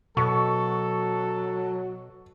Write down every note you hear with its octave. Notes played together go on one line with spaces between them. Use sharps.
B2 F#3 A4 C#6